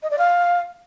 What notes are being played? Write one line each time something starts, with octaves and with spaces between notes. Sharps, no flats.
D#5
D5
F5